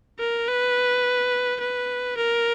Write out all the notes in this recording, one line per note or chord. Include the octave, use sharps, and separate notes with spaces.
A#4
B4
B4
A#4